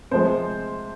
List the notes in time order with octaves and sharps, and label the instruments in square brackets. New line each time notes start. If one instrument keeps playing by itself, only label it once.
[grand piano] C3 F3 G#3 C5